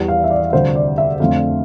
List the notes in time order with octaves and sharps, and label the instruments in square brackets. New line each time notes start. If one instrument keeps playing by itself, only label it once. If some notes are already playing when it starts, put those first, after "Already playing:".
Already playing: [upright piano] E2 E3 G3
F5
E5
D5
D2 C3 G3 C5
D5
E5
F2 D3 F3 A3 C4 F5